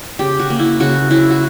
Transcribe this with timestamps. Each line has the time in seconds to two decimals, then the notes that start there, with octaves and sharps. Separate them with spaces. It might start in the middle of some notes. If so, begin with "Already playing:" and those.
0.19 C#3 G4
0.39 F#4
0.50 A#3
0.59 E4
0.80 C#3 F#4
1.11 F#3 E4
1.30 F#4